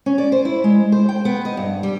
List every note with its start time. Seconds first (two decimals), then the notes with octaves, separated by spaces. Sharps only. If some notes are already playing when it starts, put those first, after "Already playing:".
0.06 C#4
0.18 D5
0.32 C5
0.45 E4
0.64 G#3
0.92 C5
1.09 G5
1.25 B3
1.45 D#5
1.57 G2
1.83 G3